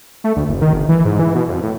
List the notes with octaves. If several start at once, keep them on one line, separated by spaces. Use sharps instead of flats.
A3
D2
F#1
D#3
G1
E3
G#2
E3
B2
F2
A2